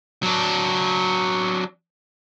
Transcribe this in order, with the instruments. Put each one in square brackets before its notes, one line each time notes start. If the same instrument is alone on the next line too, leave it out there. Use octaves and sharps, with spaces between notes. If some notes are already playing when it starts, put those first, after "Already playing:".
[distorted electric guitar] F#3 D4